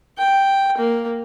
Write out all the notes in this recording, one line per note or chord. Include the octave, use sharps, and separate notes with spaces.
G5
A#3